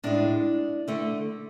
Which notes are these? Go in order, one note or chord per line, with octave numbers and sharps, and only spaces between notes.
A2 G#3 D4
D3 A3